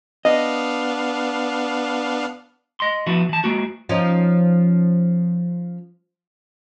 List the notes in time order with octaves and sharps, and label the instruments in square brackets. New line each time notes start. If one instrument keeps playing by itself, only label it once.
[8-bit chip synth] B3 D4 F5 [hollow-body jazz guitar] D#5
[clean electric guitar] D#5 C6
F3 B3 E4 F#4
E3 A5
G#3 A#3 F#4
[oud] F3 C#4 D#4